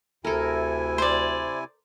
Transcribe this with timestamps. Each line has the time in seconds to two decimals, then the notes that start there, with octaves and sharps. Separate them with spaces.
0.25 D2 C3 E4 A4 A#4 G#5
0.98 C5 D5